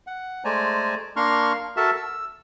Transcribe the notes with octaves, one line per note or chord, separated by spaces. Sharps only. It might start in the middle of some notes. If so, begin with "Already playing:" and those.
F#5
G#3 A3 C5 D5 G#5 A#5
A#3 D4 A#5 C6 C#6 F6
F#4 A4 A#4 E5 A5
E6